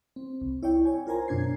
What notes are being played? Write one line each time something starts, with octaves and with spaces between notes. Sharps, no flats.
C4
C2
E4 C#5 D5 G5
C#5 G#5
F4 A#4 C5 G#5 A#5
F#2 B2 D4 G#6 C7